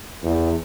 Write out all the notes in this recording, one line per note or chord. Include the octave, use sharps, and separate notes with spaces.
E2